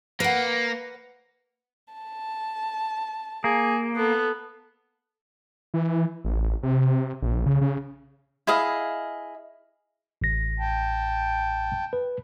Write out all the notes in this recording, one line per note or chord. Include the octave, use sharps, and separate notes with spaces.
A#3 B4 F#5
A5
A#3 G#4
B3 A4
E3
A1
C3
A#1
C#3
C#3
E4 G#4 D#5 F5
A1 A#6
G5 A5
B4